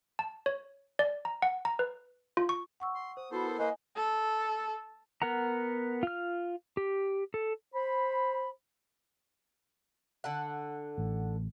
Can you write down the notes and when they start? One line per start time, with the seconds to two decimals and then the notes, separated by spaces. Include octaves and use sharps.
0.19 A5
0.46 C#5
0.99 D5
1.25 A#5
1.42 F#5
1.65 A#5
1.79 B4
2.37 F4
2.49 C#6
2.80 F#5 C#6 E6
2.95 C6
3.17 C5 D#6
3.31 B3 E4 F#4 A4 C5 B5
3.43 E4 A#4
3.58 A#3 B4 C5 D#5 G#5
3.96 A4
5.22 B3 A#4 F#5 A#5
6.03 F4 F6
6.77 G4
7.34 A4
7.75 C5 B5
10.24 D3 A4 F#5
10.98 A1